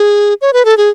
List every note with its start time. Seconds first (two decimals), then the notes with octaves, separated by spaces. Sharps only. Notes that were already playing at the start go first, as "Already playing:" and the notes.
Already playing: G#4
0.42 C#5
0.53 B4
0.65 A4
0.77 G#4